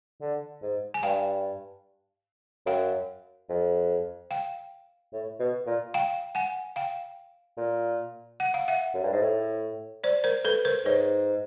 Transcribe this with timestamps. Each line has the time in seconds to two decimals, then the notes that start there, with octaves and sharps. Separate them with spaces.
0.21 D3
0.62 G#2
0.94 G#5
1.03 G2 F5 G5
2.66 F#2 F5 G5
3.49 F2
4.31 F5 G5
5.13 A2
5.40 B2
5.67 A#2
5.94 F5 G5
6.35 F#5 G#5
6.76 F5 G5
7.58 A#2
8.40 F#5
8.54 F5
8.68 E5 F#5
8.95 F#2
9.03 G2
9.13 G#2
9.22 A2
10.04 C5 D5
10.24 A#4 C5
10.45 A4 B4
10.65 A#4 C5
10.85 G#2 B4 C#5